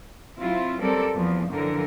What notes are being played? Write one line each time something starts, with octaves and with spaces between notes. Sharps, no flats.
F#3 C4 E4 F4
F#3 G3 C4 A4 A#4 D5
E2 F3
F#2 D3 E3 F3 A#4